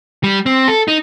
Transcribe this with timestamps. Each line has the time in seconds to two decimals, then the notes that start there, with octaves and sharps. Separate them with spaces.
0.24 G3
0.46 C4
0.68 A4
0.88 D#4